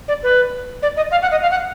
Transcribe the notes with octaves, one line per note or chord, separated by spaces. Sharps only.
D5
B4
D5
D#5
F5
F#5
D#5
F5
F#5